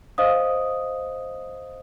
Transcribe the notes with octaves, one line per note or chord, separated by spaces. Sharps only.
C5 D#5 F5 D#6